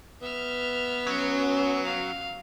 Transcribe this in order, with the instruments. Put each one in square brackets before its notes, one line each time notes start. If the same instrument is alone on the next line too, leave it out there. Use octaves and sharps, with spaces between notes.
[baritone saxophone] B3 [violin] E5 F6
[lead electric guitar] F#3 [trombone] C#4
[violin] F5